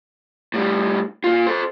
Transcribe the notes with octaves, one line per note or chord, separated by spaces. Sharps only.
A2 G3
A#2 F4
A4 C5